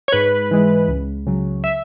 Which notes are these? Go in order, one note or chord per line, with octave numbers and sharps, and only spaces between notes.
C#5
G#2 B4
E3 G#3
C#2
C#3 F#3
E5